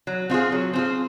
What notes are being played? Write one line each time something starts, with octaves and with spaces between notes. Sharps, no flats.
F#3
C4 F4 G#4
F#3
C4 F4 G#4